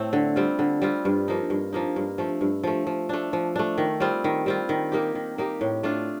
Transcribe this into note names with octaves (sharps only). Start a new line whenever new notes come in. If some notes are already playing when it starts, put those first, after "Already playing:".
Already playing: A2 A3 C4
D3
G3 C4 F4
D3
G3 C4 F4
G2
F3 A#3 D#4
G2
F3 A#3 D#4
G2
F3 A3
G2
F3 A3
F3
A3 D4
F3
A3 D4
D#3
G3 C4 F4
D#3
G3 C4 F4
D#3
A#3 D#4 G4
D#3
A#3 D#4 G4
A2
A3 D4 F4